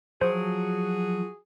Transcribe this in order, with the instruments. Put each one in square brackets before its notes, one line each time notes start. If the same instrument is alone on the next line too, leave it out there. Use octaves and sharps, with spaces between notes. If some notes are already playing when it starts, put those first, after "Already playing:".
[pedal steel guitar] F3 F#3 [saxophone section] F#4 G#4 [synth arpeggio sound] C5